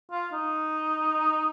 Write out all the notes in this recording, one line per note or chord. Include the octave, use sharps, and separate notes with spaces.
F4
D#4